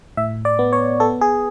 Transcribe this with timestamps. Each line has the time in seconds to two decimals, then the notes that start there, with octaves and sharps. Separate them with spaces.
0.17 A2 E5
0.45 D5
0.59 B3
0.73 C#5
1.00 B3 A4
1.21 G#4